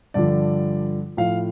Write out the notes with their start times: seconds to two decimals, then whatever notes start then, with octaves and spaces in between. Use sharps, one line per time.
0.14 G2 D3 F3 D5
1.17 A2 F3 F5